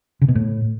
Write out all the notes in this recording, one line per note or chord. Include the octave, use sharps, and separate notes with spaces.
C#3
B2
A2